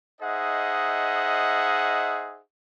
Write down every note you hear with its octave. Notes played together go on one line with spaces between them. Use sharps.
D#4 G#4 C5 D#5 E5 F#5